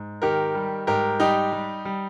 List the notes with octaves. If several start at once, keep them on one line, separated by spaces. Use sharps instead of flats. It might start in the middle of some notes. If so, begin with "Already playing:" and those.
Already playing: G#2
D#3 G4 A#4
G3
G#2 G4 A#4
G3 D#4 G4
G3
G3